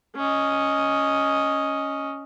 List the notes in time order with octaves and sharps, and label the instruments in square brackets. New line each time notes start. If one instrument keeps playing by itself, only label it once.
[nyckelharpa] C#4 D#5